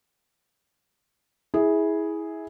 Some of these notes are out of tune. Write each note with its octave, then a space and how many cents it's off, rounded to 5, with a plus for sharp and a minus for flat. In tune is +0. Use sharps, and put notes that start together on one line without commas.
E4 -20 G#4 +0